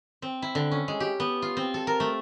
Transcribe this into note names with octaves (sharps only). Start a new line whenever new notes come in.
C4
E4
D3
C#4
G#3
G4
B3
F4
C4
A4
A#4
A3